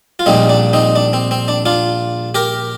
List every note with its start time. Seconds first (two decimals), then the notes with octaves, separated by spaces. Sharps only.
0.19 F4
0.26 A#1 A#2 G3 C4 D#4
0.49 D4
0.73 C4 D#4
0.96 D4
1.13 C4
1.31 C4
1.48 D4
1.66 D4 F4
2.35 G4 A#4